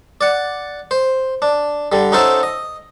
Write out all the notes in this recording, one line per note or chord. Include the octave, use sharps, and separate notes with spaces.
D5 F#5
C5
D4
D3 G3
C#4 D#4 F#4 A4 C5 E5
D#5